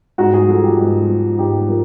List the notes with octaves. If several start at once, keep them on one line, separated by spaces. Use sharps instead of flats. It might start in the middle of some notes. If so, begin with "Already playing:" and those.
G#2 F#4
G#4
F3 A4
G4
G#2
F3
G#2 G4
F3 A#4